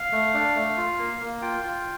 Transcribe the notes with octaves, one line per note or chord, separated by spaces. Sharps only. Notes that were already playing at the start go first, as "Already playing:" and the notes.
Already playing: F5
A3
D4
A3
F4
A#3
A#3
F4 G5
F4